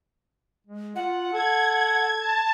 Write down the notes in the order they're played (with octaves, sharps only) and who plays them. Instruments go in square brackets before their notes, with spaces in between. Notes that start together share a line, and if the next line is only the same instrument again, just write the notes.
[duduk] G#3
[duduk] F4 [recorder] F#5
[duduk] A4 [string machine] G#6
[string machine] A5